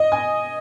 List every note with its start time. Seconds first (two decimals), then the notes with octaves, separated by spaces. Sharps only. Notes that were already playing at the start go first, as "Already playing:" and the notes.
Already playing: D#5
0.12 G#5